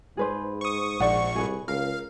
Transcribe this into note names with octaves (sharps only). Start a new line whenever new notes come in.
G#2 G#4 B4 C5
C#6 D#6
A#1 C5 D5 F#5 C#6
C2 G#4 B4
C#2 A#4 F5